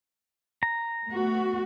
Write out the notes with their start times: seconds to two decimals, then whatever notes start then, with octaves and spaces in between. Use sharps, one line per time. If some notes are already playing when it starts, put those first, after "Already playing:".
0.63 A#5
1.09 A3 B3 F#4